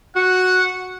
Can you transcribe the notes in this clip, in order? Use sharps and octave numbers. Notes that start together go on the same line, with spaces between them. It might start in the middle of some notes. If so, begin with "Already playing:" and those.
F#4 F#5